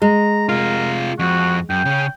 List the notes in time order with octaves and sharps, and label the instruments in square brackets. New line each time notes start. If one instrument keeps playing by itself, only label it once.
[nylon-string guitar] G#3 [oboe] A#5
[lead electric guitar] C3 F4 [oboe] A#4
[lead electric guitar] F2 [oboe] F#4
[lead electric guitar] F#2 [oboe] G5
[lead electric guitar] C#3 C#4